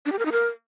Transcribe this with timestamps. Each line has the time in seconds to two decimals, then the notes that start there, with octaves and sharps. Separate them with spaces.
0.06 D4
0.12 G4
0.19 A#4
0.25 D#4
0.32 A#4